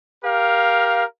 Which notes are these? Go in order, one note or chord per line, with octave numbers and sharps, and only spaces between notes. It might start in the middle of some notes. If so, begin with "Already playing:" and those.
G4 A#4 F5